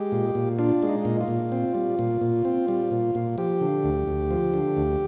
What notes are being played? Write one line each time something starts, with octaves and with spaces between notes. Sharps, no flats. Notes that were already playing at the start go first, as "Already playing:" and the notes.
Already playing: G#3 G4
A#2
A#2
D4 F4
G#3
D#4
A#2
F4
A#2
C4
G3
A#2
A#2
C4
G3
A#2
A#2
F3 G4
D3
D2
D2
F3
D3
D2